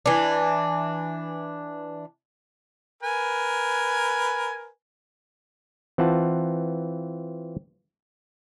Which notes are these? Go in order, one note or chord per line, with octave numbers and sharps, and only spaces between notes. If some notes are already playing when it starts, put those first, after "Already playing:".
E3 D4
A#4 B4 G#5
E3 C4 F4 F#5 A5